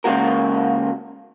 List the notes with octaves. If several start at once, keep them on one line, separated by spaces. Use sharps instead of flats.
C#3 G#3 A#3 F#4 A#4